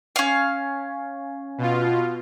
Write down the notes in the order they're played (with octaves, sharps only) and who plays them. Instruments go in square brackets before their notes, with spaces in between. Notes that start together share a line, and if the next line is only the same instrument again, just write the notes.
[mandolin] C#4 F5
[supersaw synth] B2 F4